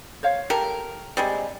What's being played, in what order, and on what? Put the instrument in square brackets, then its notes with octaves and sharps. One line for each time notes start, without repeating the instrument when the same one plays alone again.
[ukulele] C5 C#5 F5
[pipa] G4 A4 A#4 [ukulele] A5
[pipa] C3 G3 G#3 [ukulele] D5